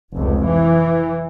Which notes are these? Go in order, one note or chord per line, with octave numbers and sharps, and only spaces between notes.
F1 C#2
E3